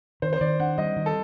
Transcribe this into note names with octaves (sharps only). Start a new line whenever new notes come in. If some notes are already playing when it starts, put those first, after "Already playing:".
D#3 C5
C5
D#3 D5
D4 F#5
G3 D#5
D#3
A4